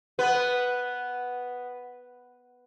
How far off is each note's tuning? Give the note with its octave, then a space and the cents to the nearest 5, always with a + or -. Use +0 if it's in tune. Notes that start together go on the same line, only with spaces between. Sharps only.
B3 +0 B4 +0